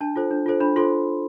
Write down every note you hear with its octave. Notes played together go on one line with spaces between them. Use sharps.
D4 A5
F4 A4 C5
D4
F4 A4 C5
D4 B5
F4 A4 C5 C6